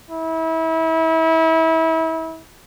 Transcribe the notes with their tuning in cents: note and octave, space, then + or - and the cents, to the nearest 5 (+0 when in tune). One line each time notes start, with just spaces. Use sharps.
E4 -30